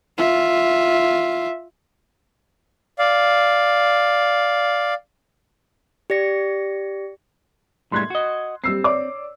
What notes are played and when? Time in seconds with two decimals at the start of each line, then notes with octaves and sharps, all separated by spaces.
0.18 F4 E5
2.99 D5 F5
6.10 G4 D5 A#6 C#7
7.92 A2 G3 G#3 C6 F#6 G#6
8.10 F#4 D#5
8.64 G3 C4 E6 C7
8.84 C#5 D5 D6